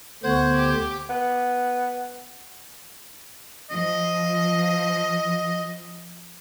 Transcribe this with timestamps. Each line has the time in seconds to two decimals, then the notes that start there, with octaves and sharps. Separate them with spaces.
0.24 D2 D3 B3 C5 F#5 C#6 G#6
0.55 G4 D6
1.09 B3
3.71 F3 D#5